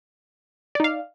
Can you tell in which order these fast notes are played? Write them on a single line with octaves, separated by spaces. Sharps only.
D5 D#4 F5